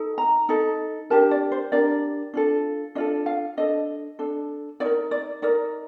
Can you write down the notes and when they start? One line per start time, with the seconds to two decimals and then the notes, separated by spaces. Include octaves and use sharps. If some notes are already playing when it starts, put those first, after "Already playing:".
Already playing: D#4 A4
0.18 A#5
0.49 D#4 A4
1.10 D4 G4 A#4 A5
1.31 D5
1.52 C5
1.72 D4 G4 A#4 D5
2.34 D4 F4 A4
2.95 D4 F4 A4 D#5
3.26 F5
3.57 D4 A4 D#5
4.19 D4 A4
4.80 D#4 A#4 D5
5.11 D5
5.42 D#4 A#4 D5